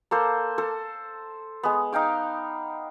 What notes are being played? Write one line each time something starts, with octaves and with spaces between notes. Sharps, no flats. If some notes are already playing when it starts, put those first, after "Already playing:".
A#3 A4 C5
A4 C5
G#3 B3
D#4 F5 G5 D6